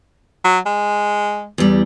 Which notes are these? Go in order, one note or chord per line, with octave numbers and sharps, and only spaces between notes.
F#3
G#3
E2 G3